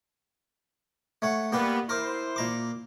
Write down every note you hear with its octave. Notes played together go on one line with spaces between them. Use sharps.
A3 C#5 F#5
G3 A#3 B3 G4 B4
E4 A#4 C5 D6
A#2 A#5 D6